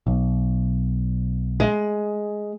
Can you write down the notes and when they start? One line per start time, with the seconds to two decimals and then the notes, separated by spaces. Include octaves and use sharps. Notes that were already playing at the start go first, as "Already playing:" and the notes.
0.07 B1
1.60 G#3